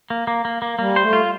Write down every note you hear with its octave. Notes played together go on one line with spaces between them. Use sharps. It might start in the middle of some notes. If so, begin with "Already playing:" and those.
A#3
A#3
A#3
A#3
G3 A#3
A3 C5
F4